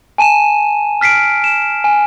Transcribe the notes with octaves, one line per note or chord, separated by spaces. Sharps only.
G#5 A5 D#7 E7
F6 B6 C7 D7
E7
G#5